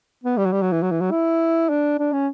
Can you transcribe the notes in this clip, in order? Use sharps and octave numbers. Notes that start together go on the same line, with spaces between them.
B3
G3
F#3
G3
F#3
E3
F#3
E3
F#3
E4
D4
D4
C#4